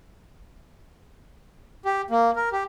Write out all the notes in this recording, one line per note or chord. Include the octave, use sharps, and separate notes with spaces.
G4
A#3
A#4
G4